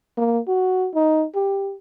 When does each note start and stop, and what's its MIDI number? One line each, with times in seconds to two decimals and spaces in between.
0.18 0.39 58
0.48 0.89 66
0.95 1.25 63
1.35 1.74 67